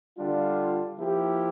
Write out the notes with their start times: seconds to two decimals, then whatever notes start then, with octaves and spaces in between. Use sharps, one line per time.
0.17 D3 G3 D4 F4
0.98 F3 A#3 E4 G4